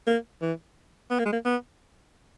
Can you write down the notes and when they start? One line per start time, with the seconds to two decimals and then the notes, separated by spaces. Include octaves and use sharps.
0.07 A#3
0.42 E3
1.10 B3
1.19 A#3
1.25 G#3
1.33 A#3
1.45 B3